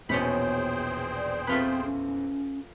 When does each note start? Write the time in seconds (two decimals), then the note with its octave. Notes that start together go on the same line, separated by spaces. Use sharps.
0.09 A#1 E2 B2 C#4 G#4 C5 G5 B5
1.15 D5
1.47 A3 C4 F4 B4
1.85 C#4